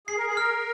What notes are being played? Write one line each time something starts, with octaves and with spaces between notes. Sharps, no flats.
G#4 C7
A#4
G#4
A#4 F6